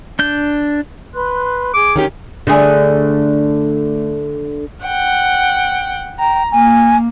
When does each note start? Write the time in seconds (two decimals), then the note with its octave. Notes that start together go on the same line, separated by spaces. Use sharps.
0.19 D4 G6
1.14 B4 C6 F#6
1.74 G#4 D6
1.96 D#3 C#4 G4
2.47 D3 A3 G#4
4.85 F#5 G5
6.19 G5 A#5
6.52 A#3 G#5